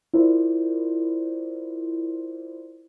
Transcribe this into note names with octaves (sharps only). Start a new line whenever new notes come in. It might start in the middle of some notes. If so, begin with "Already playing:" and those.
E4 F4 A#4 C5 D5